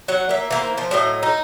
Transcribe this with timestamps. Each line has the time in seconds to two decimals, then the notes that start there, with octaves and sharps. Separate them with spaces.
0.08 F#3 F#5
0.29 A#3 E5
0.51 E3 A#3 C5
0.78 F3
0.91 A2 F#3 D#5
1.23 D#4